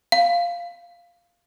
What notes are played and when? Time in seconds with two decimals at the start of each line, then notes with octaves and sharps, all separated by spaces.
0.12 F5